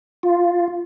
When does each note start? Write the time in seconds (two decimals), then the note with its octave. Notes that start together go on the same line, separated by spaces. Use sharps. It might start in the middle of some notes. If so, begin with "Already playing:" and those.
0.23 F4